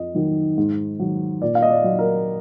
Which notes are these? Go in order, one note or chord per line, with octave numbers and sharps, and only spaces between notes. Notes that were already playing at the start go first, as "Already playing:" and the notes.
Already playing: F2 D#5
D#3 F#3
G#2
D#3 F#3
A#2 D5
F5
D#5
D5
F#3
A#4